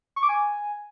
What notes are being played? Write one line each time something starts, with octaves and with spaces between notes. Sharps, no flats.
C#6
D6
G#5